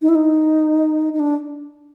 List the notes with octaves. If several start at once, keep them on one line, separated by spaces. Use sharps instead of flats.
D#4
E4
D#4
D#4
D4